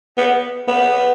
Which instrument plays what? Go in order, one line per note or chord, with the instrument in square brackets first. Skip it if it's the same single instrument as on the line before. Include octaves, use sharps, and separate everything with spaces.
[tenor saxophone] B3
B3